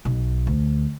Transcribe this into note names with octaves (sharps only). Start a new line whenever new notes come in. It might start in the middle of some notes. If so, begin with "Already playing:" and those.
B1
D2